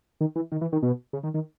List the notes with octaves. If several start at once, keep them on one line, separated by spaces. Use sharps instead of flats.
D#3
E3
D#3
E3
D#3
B2
C#3
D#3
D#3